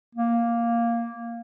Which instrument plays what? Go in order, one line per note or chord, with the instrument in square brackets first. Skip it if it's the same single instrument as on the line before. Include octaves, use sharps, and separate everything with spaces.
[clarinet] A#3